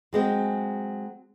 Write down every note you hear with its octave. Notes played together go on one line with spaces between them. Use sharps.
F#3 G#3 C4